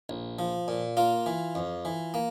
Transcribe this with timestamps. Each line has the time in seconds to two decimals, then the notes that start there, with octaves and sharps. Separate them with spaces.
0.09 A#1
0.39 F3
0.68 A#2
0.97 A#3 F4
1.26 E3
1.55 F2
1.85 E3
2.14 A#3